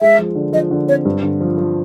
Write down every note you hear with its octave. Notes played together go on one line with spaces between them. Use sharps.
G#3 E5
F3
D3
F3 D#5
D3
C4 C#5
G2
D3
F3
F3